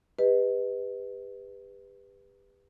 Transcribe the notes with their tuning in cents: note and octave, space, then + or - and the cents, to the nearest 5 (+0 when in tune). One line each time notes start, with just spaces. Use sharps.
G4 +35 B4 +5 D#5 +0